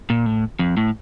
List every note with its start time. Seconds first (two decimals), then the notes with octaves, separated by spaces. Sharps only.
0.10 A#2
0.26 A2
0.59 F2
0.77 A2